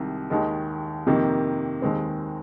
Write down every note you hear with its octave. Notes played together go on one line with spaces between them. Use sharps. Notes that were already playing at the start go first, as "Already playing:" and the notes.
Already playing: C2 C3 D#3 G#3
D#2 D#3 G#3
F2 C3 D#3 A#3
D#2 D#3 G#3 C4